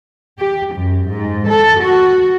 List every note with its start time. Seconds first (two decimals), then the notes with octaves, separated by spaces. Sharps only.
0.38 G4
0.75 F#2
1.10 G#2
1.50 A4
1.80 F#4